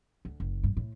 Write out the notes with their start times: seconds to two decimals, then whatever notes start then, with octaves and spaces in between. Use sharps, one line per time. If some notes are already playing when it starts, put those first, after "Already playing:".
0.25 D2
0.40 F#1
0.63 G2
0.77 A2